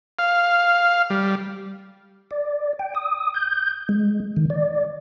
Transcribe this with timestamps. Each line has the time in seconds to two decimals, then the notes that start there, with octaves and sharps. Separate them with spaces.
0.19 F5
1.10 G3
2.31 D5
2.79 G5
2.95 D#6
3.34 G6
3.89 G#3
4.36 D#3
4.50 D5